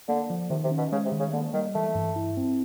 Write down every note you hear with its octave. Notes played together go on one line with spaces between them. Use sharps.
D3 A#3
F3
C3 D#3
C3
C#4
B2
C#3 G#3
C3
D#3
C#3
D3 A#3
D#3 G3
E3 A3
G2
E4
C4